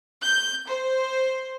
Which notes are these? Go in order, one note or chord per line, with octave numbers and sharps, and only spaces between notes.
G6
C5